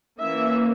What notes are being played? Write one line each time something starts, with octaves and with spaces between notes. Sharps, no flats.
E3 A#3 C#4 E5